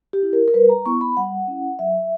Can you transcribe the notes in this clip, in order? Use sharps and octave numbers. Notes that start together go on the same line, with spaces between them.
G4
E4
A#4
A#4
G3 B4
A#5
B3 E4 C#6
B5
G3 F#5
C#4 E4
F#3 E5